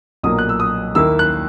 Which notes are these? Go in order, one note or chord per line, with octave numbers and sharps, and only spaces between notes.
B1 A#2 F#3 A#3 D#6
F#6
E6
D#6
D#2 D#3 A#3 E4 E6
F#6